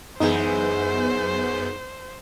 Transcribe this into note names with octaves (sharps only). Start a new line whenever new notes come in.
F#2 E3 G#3 B3 D#4 G#4 C5 G6